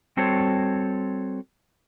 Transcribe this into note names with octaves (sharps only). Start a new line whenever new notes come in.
G3 C4 F#4 A4 C5 C#5